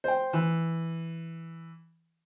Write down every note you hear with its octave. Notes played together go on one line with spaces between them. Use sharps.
C5 G5
E3